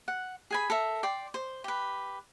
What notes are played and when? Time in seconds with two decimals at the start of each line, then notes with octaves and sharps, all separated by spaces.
0.08 F#5
0.51 G#4 G#5 B5
0.70 A4 A#4 E5
1.03 D5 G5 C6
1.34 C5
1.64 G4 B4